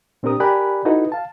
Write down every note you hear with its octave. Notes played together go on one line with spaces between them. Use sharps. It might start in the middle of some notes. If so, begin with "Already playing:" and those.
A#2 C4 D4 G4 A#4 D#6
G4 A#4 D5 G#5 B5 F#6
D#4 E4 F#4 A4 B4 D#5
F5 A5